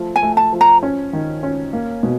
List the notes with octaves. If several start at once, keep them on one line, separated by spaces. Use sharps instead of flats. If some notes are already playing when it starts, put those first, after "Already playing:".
Already playing: F3 A3
G#5
A3
A5
F3
A#5
C#4
D#3
C#4
A#3
B2